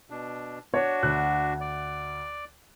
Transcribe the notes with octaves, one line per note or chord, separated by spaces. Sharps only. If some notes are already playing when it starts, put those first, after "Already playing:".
B2 D4
D4 F#4 C#5
D2 F#6
D5